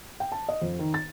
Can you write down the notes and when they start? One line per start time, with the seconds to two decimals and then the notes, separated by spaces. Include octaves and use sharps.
0.20 G5
0.32 A5
0.49 D#5
0.62 F2
0.79 D#3
0.94 A6